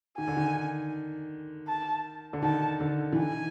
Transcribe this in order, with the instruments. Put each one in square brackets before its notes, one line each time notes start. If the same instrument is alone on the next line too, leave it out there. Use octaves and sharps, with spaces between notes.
[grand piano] D#3 [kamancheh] G#5
[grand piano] D3
D#3
[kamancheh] A5
[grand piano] D3
[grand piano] D#3 [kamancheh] A5
[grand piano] D3
E3
[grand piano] D#3 [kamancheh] G#5